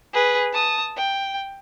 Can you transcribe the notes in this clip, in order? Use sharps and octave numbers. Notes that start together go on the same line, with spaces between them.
G#4 B4
A5 D#6
G5